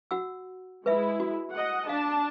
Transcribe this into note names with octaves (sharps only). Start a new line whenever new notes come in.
F#4 F#5 E6
G#3 E4 B4 E5
F#4
D#5 F#5
D4 F5 A5